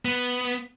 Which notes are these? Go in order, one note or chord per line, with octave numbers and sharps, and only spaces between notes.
B3